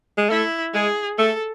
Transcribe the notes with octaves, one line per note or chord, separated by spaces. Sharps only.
G#3
A3 E4
G#3 G#4
A3 A4